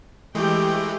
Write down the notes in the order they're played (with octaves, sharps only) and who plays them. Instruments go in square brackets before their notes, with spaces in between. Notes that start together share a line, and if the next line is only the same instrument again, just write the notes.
[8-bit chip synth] E3 G#3 A3 [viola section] G4 G5